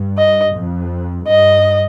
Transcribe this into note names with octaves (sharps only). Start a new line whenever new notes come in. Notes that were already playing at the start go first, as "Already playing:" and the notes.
Already playing: G2
D#5
F2
G2 D#5